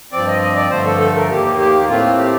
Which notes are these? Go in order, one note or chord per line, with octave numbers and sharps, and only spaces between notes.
G2 F3 C4 D5
D#5
D#5
D5
G2 D3 F3 A3 C5
A4
A4
A#4
D#2 D#3 A#3 G4
G4
A2 A3 C4 F4
G4